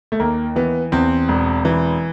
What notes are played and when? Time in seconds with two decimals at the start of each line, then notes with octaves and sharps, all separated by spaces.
0.12 A3
0.20 D#2 A#3
0.56 E3 B3
0.92 E2 C4
1.28 E1
1.65 E3